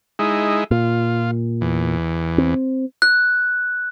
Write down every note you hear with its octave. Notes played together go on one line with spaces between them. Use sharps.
G#3 D#4 E4
A#2 F4
E2
C4
F#6